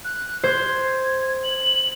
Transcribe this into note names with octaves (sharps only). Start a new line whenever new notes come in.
F#6
C5 G#6
F#7